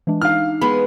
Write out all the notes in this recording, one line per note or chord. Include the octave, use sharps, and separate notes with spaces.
E3 G#3 D4
D#4 F5 F6
G#3 B3 B5